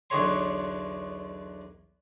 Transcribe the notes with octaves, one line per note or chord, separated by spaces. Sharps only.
B1 E2 D3 C#5 C6